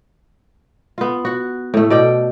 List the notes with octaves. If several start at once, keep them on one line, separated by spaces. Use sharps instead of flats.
B3 F4
F#4 F#5
A2 A3
B2 D5 G5